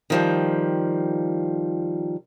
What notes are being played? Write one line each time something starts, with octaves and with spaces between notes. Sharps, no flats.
D#3 F3 G3